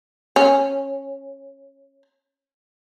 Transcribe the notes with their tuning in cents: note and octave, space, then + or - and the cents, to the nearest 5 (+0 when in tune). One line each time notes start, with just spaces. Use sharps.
C#4 -15